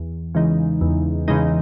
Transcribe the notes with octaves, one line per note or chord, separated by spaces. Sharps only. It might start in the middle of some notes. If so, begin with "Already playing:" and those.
Already playing: E2
C#3 E3 G#3 D#4
E2
C#3 E3 G#3 D#4